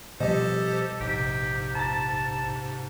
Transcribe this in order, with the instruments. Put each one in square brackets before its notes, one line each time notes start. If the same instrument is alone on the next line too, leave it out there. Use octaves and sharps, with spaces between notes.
[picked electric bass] B2 F3 G3 [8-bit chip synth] G4 C5 [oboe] A4 [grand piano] D#5
[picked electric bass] A#1 [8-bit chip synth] G#2 C3 [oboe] G4
[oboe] A5 [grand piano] A#5 A6